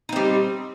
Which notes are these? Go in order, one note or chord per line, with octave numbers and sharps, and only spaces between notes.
G3 C4 D#4